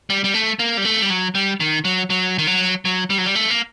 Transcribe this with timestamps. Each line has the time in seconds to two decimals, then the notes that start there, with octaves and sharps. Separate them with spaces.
0.10 G3
0.24 G3
0.34 A3
0.59 A#3
0.77 G3
0.85 A3
1.02 G3
1.09 F#3
1.35 G3
1.60 D#3
1.85 F#3
2.10 F#3
2.38 D#3
2.47 F#3
2.85 F#3
3.10 G3
3.18 F#3
3.26 G3
3.35 A3
3.50 A#3